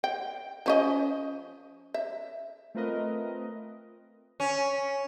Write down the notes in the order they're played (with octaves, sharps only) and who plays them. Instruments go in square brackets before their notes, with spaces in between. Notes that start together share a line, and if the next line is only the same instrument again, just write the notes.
[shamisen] G5
F3 C#4 D#5
E5
[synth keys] A3 C4 F4 A#4 B4 D#5
[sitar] C#4